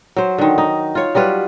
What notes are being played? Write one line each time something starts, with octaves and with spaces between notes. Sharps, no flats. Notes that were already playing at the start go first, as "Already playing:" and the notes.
F#3 C5
D3 D#3
D#4
F4 C#5
F#3 G3 F4 B4